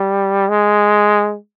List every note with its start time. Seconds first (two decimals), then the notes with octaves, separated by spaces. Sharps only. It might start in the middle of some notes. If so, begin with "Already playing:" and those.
Already playing: G3
0.50 G#3